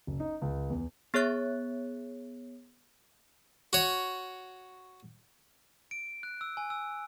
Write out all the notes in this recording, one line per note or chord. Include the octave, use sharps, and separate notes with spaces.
F#1
D#4
C#2
E2
B3 G#4 C#5 F#6 A6
F#4 C#5
D7
F#6
E6
G#5
E6